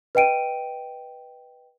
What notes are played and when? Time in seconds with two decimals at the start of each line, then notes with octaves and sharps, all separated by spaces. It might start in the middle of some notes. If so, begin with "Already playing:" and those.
0.15 B4 D#5 G5 D7 D#7